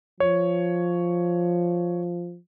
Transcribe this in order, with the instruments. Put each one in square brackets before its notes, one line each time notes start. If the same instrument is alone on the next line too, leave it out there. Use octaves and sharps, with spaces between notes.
[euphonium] F3 [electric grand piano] C#5